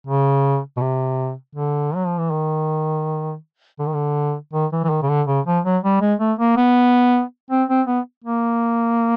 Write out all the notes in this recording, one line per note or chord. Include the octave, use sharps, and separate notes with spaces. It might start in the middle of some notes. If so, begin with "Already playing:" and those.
C#3
B2
C3
D3
F#3
F3
E3
D#3
D3
D#3
D3
D#3
E3
E3
D#3
C#3
D3
C#3
F3
F#3
G3
G#3
A3
A#3
B3
C4
C4
B3
A#3